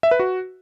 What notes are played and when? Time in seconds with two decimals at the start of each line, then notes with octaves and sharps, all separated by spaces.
0.03 E5
0.11 B4
0.20 F#4